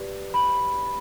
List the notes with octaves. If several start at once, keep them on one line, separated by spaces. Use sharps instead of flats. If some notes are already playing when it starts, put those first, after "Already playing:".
Already playing: G4 B4 D5
B5